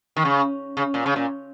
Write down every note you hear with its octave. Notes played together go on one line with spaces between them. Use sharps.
D#3
C#3
C#3
A#2
C#3
A#2